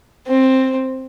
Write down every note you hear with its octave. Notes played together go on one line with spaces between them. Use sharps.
C4